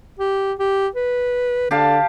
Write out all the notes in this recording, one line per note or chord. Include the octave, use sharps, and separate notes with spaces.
G4
G4
B4
D3 G4 F5 A5